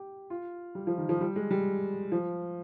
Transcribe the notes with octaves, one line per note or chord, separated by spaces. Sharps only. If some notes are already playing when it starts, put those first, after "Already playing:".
Already playing: G4
F4
G3
F3
D#3
F3
G3
G#3
G3
F3